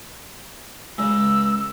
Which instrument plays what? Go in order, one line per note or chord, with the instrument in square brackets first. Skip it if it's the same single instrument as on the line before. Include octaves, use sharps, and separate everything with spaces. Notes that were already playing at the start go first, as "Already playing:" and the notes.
[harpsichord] C#2 [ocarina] E6